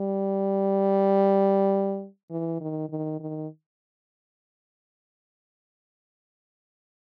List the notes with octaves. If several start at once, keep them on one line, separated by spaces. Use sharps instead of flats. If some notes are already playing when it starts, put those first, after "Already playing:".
Already playing: G3
E3
D#3
D#3
D#3